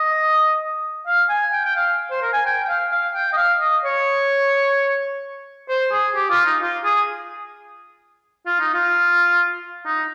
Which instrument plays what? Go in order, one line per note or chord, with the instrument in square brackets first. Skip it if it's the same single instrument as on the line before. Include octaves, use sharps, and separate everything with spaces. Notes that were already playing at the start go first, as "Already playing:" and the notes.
Already playing: [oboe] D#5
F5
G#5
G5
G5
F5
C5
A#4
G#5
G5
G5
F5
F5
G5
D#5
F5
D#5
C#5
C5
G#4
G4
F4
D#4
F4
G#4
F4
D#4
F4
D#4